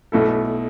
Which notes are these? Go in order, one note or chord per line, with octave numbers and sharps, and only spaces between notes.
B1 B2 A3 E4 A4